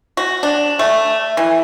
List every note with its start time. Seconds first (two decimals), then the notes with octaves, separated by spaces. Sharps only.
0.17 F#4
0.43 D4
0.79 A3
1.37 E3